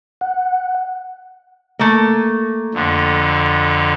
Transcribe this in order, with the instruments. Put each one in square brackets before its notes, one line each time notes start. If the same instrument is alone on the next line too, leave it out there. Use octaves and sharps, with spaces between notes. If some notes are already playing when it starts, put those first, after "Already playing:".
[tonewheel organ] F#5
[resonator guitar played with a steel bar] A3 A#3
[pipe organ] F2 D3